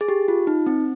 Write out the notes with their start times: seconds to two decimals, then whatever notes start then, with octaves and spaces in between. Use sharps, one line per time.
0.01 G#4
0.08 G4
0.28 F4
0.47 D#4
0.66 C4